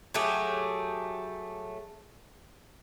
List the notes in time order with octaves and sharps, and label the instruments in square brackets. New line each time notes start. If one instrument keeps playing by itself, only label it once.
[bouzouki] F#3 A3 G4 G#4